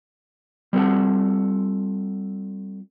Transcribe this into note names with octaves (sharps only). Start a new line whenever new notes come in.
G3 C4 F4 A4 F#5